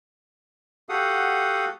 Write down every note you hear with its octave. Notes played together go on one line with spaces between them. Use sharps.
F#4 G4 A4 F5 F#5 D#6